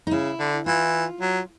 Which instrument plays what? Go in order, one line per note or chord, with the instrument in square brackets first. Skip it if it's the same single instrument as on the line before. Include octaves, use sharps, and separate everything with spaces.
[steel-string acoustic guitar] D#4
[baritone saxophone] C#3 [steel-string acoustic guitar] E4
[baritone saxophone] D3
[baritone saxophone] E3 [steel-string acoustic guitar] F4
[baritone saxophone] F#3